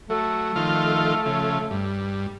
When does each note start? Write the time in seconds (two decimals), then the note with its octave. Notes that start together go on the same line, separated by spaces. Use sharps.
0.10 F#3 A3
0.56 D#3 F3 F4
1.26 C#3 F3
1.71 G2